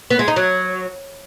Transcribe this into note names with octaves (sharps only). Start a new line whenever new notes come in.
B3
G#3
D#4
F#3